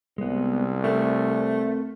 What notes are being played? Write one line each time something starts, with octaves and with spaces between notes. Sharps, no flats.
C2 G#3 B3
A3 C4 A4 A#4